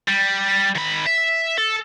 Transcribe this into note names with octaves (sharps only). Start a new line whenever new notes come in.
G3
D#3 B5
E5
A4